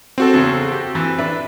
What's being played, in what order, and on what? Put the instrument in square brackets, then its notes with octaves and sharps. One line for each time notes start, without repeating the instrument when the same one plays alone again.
[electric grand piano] C4 F#4 A4
[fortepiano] E2 C#3
G4
E3
D4 B4 E5